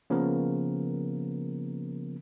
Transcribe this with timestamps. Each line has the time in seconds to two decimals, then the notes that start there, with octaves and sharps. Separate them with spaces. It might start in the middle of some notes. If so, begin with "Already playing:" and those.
0.10 C#3 F3 A#3 B3 A#4